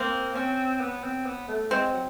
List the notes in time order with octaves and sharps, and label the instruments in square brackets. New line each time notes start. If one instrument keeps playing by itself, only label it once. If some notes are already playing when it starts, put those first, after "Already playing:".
Already playing: [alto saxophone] A#3 [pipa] C4
[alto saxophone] C4 [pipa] C#4
[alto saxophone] B3
C4
B3
A3
[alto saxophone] G#3 [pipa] C4
[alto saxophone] F#3